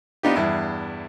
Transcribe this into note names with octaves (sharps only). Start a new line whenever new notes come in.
B3 D4 D#4 F4 G4
E2 G2 E4